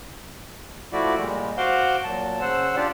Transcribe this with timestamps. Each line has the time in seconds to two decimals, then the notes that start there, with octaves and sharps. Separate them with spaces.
0.93 F3 A3 E4 F#4 D5
1.18 A#2 G3 G#3
1.57 F#4 C5 F5 F#5 C6 D6
2.04 A#2 F#3 A5
2.41 C#3 C5 F#5 E6
2.76 D4 F4 G4 D5